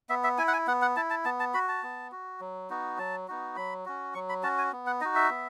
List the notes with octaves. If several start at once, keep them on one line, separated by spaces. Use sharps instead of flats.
B3 E5
E5
E4 G#5
F#5
G#5
B3 F#5
F#5
E4 A5
A5
B3 A5
A5
F#4 B5
A5
B3
F#4
F#3
B3 D#4 F#4
F#3 A5
B3 D#4 F#4
F#3 B5
C#4 F#4
F#3 C#6
B5
C#4 F#4 A5
G#5
B3
F#5
D#4 F#4 D#5
E5
B3